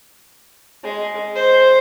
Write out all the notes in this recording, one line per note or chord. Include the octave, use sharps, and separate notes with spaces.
G#3
C5